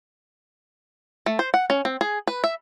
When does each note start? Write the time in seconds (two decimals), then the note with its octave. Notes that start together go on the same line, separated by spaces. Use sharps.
1.26 A3
1.39 C5
1.54 F#5
1.70 C#4
1.85 C4
2.01 G#4
2.27 B4
2.44 E5